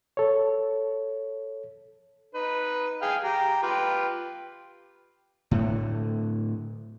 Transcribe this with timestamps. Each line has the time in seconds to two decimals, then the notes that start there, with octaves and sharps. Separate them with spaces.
0.17 A4 C#5
2.34 D#4 B4
3.02 G#4 F5 G5
3.24 G4 A#5
3.63 F4 G4 B4
5.51 A2 D3 A3